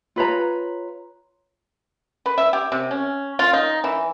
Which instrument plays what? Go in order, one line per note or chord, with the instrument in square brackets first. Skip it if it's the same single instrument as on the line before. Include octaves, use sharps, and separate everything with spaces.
[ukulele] F4 B4 C#5 A#5
[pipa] B4
E5
G4
C3
C#4
F4
D#4
E3